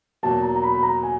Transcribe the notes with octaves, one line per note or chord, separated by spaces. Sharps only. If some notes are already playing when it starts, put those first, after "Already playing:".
E2 B2 F#3 A#3 A5
A#5
A#5
B5
B5
A#5
G#5